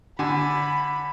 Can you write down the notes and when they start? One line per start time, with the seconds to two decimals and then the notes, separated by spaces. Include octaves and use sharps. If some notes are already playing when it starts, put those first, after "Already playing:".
0.19 D3 G#5 B5